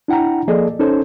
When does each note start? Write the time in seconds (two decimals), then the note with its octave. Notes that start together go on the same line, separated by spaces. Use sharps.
0.08 D4 E4 F#5 G5 A#5
0.48 F3 A#3 G#4 A4 D5 D#5
0.79 C#4 D#4 A4 C5 C#5